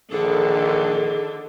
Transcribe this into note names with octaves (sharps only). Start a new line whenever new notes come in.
A#1 D3 D#3 G#4 A4